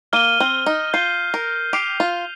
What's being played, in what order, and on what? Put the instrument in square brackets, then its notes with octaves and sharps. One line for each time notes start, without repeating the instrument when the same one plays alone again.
[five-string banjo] A#3 [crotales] F6 D#7 G7
[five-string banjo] C4
D#4
[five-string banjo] F4 [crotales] G6 C7 D#7 G7
[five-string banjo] A#4
[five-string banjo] G4 [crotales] F6 C7 F7
[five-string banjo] F4